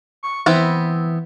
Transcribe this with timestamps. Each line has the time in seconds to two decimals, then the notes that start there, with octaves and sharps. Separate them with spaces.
0.23 C#6
0.46 E3 B3 C4 E4